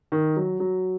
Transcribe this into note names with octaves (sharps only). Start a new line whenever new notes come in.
D#3
F#3
F#3